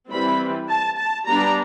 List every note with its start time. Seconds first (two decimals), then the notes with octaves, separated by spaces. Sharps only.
0.10 E3 G3 C4 B5
0.69 A5
0.97 A5
1.27 G3 B3 D4 A#5